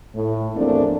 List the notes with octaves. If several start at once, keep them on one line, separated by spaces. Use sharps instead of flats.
A2
E2 F3 A3 A#3 C4 D4